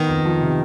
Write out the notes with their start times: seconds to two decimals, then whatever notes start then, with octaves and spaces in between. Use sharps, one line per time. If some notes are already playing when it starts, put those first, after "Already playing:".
Already playing: D#3 B3
0.08 F2
0.25 F3
0.41 C3